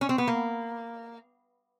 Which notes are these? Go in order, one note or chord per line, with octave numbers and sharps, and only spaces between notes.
C#4
C4
B3
A#3